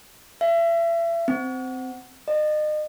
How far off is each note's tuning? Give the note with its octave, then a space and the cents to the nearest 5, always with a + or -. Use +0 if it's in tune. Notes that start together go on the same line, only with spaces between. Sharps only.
E5 +35
C4 -15
D#5 -35